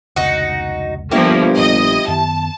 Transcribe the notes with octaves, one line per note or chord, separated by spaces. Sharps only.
F1 C#2 D#4 F#4
G1 F3 A#3 E4 G4
A#1 F3 D#5
F#2 D#3 B3 A5